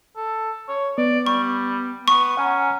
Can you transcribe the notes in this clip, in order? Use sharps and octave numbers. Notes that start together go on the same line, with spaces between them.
A4
C#5
B3 D5
G3 C#6
B3 C#6
C#4 F#5 G#5 A#5